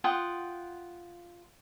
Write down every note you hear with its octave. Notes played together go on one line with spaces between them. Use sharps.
F4 F#5 G5 D#6